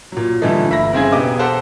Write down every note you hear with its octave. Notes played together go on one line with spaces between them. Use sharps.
A#2 F#3
A#2 D3 E3 G3 A3 D#4
G1 E5 B5 A#6
G2 C#3 C4 E4 G#4 G#6
E1 B3 G4 D#5 D6
G4 A4 C5 F5 F#5